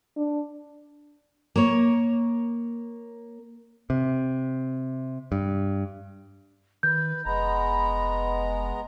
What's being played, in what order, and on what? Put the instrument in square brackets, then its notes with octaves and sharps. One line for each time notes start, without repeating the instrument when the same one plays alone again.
[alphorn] D4
[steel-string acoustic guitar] A#3 C#5
[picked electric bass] C3
G2
[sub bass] D#3 [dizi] B4 [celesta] G6
[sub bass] F1 [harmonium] G#3 B3 A#5 [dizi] B5